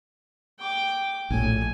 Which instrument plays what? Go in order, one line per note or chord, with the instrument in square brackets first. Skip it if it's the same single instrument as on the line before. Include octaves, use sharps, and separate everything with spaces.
[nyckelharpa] G5 D6
[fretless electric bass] A#1 A2 [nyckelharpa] G#5